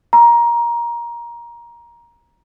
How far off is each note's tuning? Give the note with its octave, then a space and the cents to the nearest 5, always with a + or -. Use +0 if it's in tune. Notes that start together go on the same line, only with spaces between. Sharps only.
A#5 +15